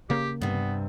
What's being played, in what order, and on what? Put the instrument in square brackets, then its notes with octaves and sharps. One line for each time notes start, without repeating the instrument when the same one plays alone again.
[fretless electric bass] C#3 A#3 [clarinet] G4
[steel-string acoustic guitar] G2 C3 [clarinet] B3